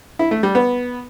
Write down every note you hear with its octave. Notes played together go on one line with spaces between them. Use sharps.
E4
A3
G3
B3